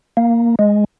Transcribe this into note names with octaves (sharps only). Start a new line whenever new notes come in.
A#3
G#3